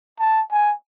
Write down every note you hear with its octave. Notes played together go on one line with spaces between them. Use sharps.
A5
G#5